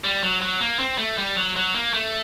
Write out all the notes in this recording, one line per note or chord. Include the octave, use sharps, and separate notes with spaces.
G3
F#3
F#3
A#3
C4
A3
G3
F#3
F#3
A#3
A3